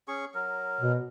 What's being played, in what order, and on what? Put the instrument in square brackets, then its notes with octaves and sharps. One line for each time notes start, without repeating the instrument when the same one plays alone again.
[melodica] C#4 G#4 C#6
F#3 A#4
[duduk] B2